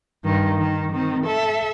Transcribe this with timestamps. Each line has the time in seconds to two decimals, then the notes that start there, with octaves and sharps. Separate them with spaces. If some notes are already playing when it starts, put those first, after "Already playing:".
0.25 G2 D#3
0.59 D#3
0.93 D#3 C4
1.26 A4 E5